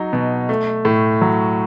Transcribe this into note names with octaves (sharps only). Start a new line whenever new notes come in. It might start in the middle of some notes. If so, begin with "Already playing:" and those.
Already playing: F#3 D#4
B2
A3
A2
F#3